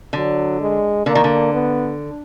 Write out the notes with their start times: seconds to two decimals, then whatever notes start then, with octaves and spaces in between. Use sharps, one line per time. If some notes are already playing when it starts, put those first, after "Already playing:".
0.13 D3 F#3
0.60 G#3
1.06 D3 A#3
1.15 D#3
1.24 D3
1.53 B3